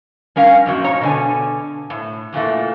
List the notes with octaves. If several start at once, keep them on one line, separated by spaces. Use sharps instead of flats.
G3 C#4 A#4 F5
F#2 A#2 F#3
G#2 C#5 A#5
B2 D3 G#5
A2
E2 A#2 E3 A3